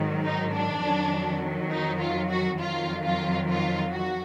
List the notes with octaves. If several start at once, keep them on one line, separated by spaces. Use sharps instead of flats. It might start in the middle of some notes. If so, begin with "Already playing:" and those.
Already playing: G#2 D#3 F#3
D#4
D4
F2 D#3 F#3
D#4
F4
F#4
F2 D#3 F#3 F4
F4
F4
F#4